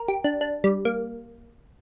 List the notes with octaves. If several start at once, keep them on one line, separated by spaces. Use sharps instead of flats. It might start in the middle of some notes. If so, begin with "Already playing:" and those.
Already playing: A#4
G4
D4
D4
G3
A#3